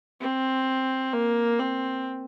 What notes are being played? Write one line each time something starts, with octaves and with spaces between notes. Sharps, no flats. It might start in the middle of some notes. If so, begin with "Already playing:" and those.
C4
A#3
C4